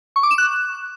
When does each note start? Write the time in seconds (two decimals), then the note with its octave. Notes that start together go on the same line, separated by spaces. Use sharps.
0.16 C#6
0.23 D6
0.31 E7
0.38 F#6